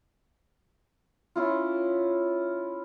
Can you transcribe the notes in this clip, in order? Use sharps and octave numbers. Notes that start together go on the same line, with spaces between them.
C#4 E4 F4